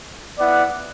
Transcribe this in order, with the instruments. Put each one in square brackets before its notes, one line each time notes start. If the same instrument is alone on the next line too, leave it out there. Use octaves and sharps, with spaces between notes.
[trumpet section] B3 E4 D5 F#5